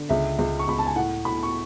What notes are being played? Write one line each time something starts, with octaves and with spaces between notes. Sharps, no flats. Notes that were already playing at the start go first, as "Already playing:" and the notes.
Already playing: D3
C#2 E5
C#2
C#6
C#2 B5
A5
G#5
A2 F#5
A2 B5
C#6